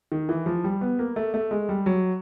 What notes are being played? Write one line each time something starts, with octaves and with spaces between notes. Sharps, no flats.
D#3
E3
F3
G3
B3
A#3
A3
A3
G#3
G3
F#3